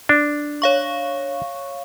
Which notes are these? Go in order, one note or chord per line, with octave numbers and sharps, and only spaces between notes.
D4
C#5 F5 C#6